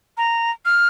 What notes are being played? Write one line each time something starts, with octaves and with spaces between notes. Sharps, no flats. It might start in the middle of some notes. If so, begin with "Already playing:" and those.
A#5
F6